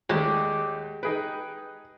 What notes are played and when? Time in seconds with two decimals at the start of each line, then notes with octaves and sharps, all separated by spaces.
0.09 D#2 G#3 A3 G4 D5 F#5
1.03 D#4 G#4 B4 G5